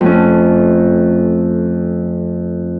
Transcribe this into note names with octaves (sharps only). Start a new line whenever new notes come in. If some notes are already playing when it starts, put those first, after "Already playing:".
F2 A3 C#4